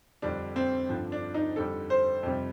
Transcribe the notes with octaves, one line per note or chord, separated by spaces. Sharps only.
F2 D3 G3 D4
C4
G2 D3 F3
D4
D#4
F2 D3 G3 A4
C5
F2 C3 G3